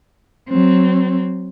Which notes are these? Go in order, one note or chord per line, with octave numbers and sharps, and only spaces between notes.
F#3 C4